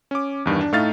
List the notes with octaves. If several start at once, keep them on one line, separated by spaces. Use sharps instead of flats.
C#4 D6
E2 G2 D#3
D4
A2 A3 D#4 F5 F6 A6